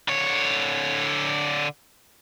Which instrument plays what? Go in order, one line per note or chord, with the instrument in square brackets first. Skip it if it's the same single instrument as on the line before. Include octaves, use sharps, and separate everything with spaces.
[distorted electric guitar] D3 C#5